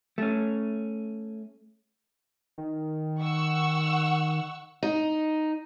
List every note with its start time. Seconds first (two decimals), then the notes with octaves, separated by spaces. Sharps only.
0.18 A3 C#4
2.58 D#3
3.20 F#5 C#6 E6
4.83 D#4